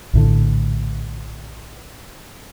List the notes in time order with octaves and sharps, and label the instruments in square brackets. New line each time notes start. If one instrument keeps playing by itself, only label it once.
[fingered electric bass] A#1 A2 D3